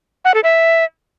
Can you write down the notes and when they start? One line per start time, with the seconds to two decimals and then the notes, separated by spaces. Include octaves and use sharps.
0.25 F#5
0.34 A4
0.44 E5